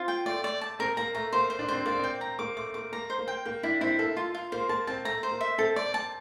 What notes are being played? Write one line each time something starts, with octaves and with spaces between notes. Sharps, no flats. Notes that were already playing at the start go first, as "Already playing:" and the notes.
Already playing: C4 F4
G5
A3 D5
D5
A5
C4 A#4
A#3 A#5
A3 A#5
A#3 C5
C5
D4
C4 C5
A#3 D5
C4 G5
A#5
A#3 D6
A3 D6
A#3 D6
A#3 A#5
C5
A#3
G5
A#3 G5
D4 E4
C4 E4
A#3 A4
F4
F4
A#3 C5
A#3 A5
C4 A5
A3 A#5
C5
A#3
E5
C4 A4
D5
A5